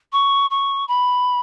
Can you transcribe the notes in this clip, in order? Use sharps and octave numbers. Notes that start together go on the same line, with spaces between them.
C#6
C#6
B5